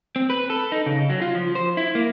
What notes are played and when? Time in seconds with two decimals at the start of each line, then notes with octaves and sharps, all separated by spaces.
0.16 C4
0.30 B4
0.50 A4
0.72 D#4
0.86 C#3
1.10 F#3
1.22 F4
1.35 F3
1.55 C5
1.77 E4
1.95 A#3